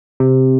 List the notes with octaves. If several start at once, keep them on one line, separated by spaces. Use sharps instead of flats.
C3